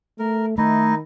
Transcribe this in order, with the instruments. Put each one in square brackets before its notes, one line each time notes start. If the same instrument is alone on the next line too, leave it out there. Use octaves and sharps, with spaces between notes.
[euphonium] A3 [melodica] A#4
[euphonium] D#3 [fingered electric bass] A3 [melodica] D#4 E4 D#5